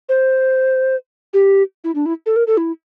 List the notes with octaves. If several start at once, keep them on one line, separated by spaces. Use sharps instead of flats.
C5
G4
E4
D4
E4
A4
A#4
A4
E4